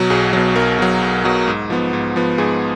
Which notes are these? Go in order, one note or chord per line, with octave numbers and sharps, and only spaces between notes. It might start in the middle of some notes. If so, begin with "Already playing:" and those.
Already playing: B2 F#3 F#4
B1 G#4
B2 F#3
B1 A#4
B2 F#3
B1
B2 F#3
G#2
F3 B3
G#2
F3 B3
G#2 G#4